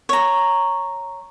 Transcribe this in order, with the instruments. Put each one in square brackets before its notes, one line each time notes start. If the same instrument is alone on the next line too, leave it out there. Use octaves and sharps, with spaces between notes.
[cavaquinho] C#5 A#5